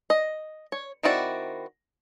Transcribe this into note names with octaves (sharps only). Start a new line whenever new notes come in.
D#5
C#5
D#3 C4 E4 F#4 D5